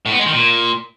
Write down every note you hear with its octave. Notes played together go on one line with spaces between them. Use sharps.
A2
B3
G#3
D#3
A#2